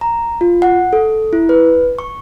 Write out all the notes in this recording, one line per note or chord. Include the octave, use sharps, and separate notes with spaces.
A#5
F4
F#5
A4
E4
B4
C#6